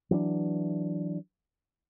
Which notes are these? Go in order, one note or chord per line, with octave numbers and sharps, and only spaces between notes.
E3 F#3 C4 D4